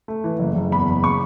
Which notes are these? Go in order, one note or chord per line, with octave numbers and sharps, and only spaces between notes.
A3
E3
F#1
F#1
E2 B5
F#1
C#3 C#6